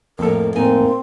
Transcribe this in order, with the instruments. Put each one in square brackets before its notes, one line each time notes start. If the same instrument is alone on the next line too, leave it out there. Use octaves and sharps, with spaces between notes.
[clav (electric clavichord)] F2 A4 [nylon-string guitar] A2 F3 A#3 [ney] A#4
[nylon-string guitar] A2 D#4 G#5 [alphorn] A#3 [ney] C4